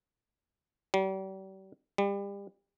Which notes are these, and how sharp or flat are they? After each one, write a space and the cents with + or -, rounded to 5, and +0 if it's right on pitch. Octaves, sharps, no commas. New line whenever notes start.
G3 -40
G3 +30